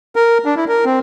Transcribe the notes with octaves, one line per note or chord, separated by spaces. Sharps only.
A#4
D4
E4
A#4
C4